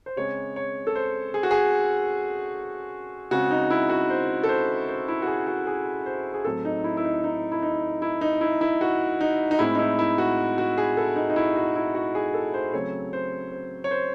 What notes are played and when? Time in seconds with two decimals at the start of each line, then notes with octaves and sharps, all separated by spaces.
0.06 C5
0.16 C#3 G#3 C4 C#5
0.56 C#5
0.87 A4
0.95 C5
1.34 G#4
1.43 F#4
1.51 G#4
3.31 C#3 G#3 C4 F#4
3.51 D#4
3.70 E4
3.90 F#4
4.10 C5
4.43 A4
4.49 C5
4.89 C5
5.08 E4
5.22 F#4
5.27 G#4
5.47 F#4
5.67 G#4
6.06 C5
6.34 G#4
6.45 A2 F#3 C4 A4
6.65 D#4
6.84 E4
6.97 E4
7.05 D#4
7.24 D#4
7.52 E4
7.62 D#4
8.02 E4
8.21 D#4
8.41 E4
8.61 E4
8.81 F#4
9.21 D#4
9.51 D#4
9.59 A2 G#3 C4 E4
9.75 D#4
9.79 E4
9.99 E4
10.18 F#4
10.58 F#4
10.78 G#4
10.97 A4
11.16 D#4
11.30 D#4
11.36 E4
11.56 F#4
11.76 E4
11.95 F#4
12.15 G#4
12.34 A4
12.54 C5
12.73 C#3 F#3 A3 C4 C#5
13.13 C5
13.52 C5
13.84 C#5
13.91 C5